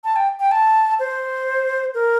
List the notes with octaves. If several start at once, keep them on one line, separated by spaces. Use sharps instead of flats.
A5
G5
G5
A5
C5
A#4